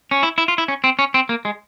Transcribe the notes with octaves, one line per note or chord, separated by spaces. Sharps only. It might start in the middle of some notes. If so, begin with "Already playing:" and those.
C#4
E4
E4
F4
E4
C#4
C4
C#4
C4
A#3
G#3